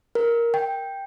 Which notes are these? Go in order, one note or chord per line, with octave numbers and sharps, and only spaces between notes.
A#4
G5